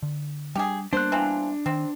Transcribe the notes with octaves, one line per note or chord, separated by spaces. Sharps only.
D3
G3 D4 G4 G#4
G3 A#3 B3 D4 C5 F#6
E3 F3 C4
D#3 C4